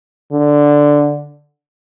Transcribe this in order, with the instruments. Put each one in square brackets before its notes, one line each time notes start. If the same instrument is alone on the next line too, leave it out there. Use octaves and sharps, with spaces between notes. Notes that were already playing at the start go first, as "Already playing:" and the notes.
[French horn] D3